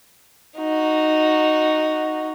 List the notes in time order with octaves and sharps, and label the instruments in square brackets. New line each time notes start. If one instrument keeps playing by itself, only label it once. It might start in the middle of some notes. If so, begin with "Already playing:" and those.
[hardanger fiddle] D#4 F#4